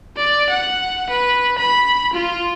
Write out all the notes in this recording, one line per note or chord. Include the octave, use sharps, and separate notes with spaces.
D5
F#5
B4
B5
F4